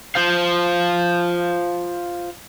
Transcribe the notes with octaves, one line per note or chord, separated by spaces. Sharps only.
F4 C5 F5